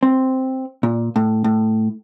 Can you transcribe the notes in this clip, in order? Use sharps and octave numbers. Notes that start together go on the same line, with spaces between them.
C4
A#2
A2
A2